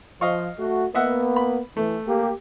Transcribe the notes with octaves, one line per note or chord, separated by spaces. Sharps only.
F3 D#5 F5 C#6
A3 F#4
A#3 B3 D#5 E5 F#5
B5
E3 A3
A#3 G4